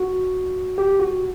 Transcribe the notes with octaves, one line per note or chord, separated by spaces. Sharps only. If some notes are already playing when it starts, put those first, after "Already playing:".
Already playing: F#4
G4
F#4